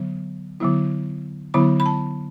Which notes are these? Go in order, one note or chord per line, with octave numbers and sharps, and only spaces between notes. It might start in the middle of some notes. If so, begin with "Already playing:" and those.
Already playing: D3 F#3 B3
D3 F#3 B3 E4
D3 F#3 B3 E4 B5
B5
A5